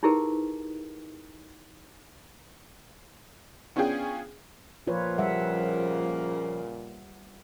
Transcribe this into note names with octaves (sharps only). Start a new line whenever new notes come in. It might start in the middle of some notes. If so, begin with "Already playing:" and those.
D#4 E4 G4 G#4 A#4 B4
B3 C#4 D4 F4 G#4 G5
A#2 F3 F4 B4 C#5
C#3 G3 A#3 E5 F#5